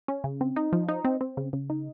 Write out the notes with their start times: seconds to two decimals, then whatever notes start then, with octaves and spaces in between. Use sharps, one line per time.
0.08 C#4
0.24 C#3
0.41 C4
0.56 D#4
0.72 F3
0.88 D#4
1.05 C4
1.21 C4
1.37 C#3
1.53 C#3
1.70 D#4